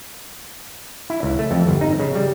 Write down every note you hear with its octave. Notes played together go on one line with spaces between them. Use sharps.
E4
C#2
A3
F2
G1
D#4
C#3
G3